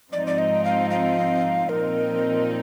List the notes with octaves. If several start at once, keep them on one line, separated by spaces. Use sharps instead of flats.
G#2 F3 C4 D#4 D5
D5
D#5
F5
F5
A#2 F3 C4 D#4 A#4